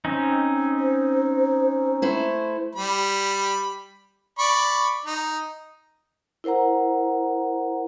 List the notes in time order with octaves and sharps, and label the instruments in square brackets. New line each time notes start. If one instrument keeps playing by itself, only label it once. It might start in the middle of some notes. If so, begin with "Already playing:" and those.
[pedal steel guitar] C4 C#4 D#4
[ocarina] C5
[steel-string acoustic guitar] A3 E4 C5
[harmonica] G3 B5
D5 B5 C#6
D#4
[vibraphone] E4 A#4 C5 F#5 A#5